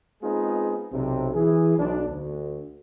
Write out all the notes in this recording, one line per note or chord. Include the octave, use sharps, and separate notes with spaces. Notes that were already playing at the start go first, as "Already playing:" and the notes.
G#3 B3 C4 D#4 F4 G#4
B1 C3
E3 G#4
B1 D4
D2